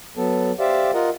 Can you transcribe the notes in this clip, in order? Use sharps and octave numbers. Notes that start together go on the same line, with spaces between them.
F#3 B3 A4
G4 C5 D5 E5 F5
F4 A#4 D#5 F#5